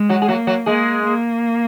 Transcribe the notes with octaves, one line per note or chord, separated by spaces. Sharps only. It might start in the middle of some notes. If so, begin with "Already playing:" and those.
Already playing: G#3
F#3 F#4
G#4
F#3 A#3 F#4
F#3 F#4
G#3 A#3 G#4
A#3